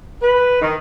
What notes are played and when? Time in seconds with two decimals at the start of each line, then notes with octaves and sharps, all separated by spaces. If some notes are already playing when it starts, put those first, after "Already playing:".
0.22 B4
0.61 D#3